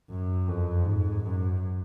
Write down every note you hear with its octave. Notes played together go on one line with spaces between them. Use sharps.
F#2
F2
G#2
F#2